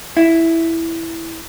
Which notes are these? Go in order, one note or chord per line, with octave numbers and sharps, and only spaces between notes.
E4